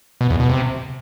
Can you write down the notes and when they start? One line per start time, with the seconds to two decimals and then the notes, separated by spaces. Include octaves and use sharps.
0.21 B2
0.30 E2
0.40 B2
0.49 C3